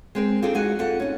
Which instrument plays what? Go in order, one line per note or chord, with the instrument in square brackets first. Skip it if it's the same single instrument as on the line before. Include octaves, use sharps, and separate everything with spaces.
[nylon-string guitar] G#3 C4 A#4
C4 D4 D#4 F4 G#4 A4
F2 G#3 D#4 F#4 F#5 G#5
F2 A4 F#5
C#4 D#4